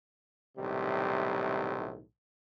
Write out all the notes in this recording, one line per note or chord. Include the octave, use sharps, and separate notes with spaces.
B1 A2 C3 D#3 G3